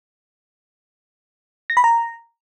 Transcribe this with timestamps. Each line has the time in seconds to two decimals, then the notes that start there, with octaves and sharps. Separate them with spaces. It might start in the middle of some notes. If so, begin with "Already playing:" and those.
1.70 A#6
1.77 B5
1.84 A#5